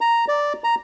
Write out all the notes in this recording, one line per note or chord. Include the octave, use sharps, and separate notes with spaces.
A#5
D5
A#5